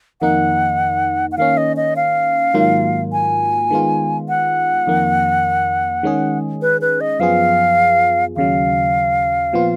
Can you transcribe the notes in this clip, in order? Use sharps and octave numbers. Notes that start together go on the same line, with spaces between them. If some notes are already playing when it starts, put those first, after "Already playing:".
F2 D#3 A#3 D#4 F#5
F#5
D#3 A#3 C#4 F5
D#5
D#5
F5
G#2 D#3 F#3 A#3 F4
G#5
D#3 G#3 B3 F4
F#5
F2 D#3 A#3
D#3 G#3 C#4 G#4
B4
B4
D#5
F#2 F3 B3 F4 G#4 F5
D#2 C#3 F#3 F5
A#2 F3 B3 F4